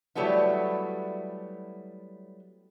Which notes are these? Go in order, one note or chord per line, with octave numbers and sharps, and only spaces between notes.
F#3 G3 A3 B3 E4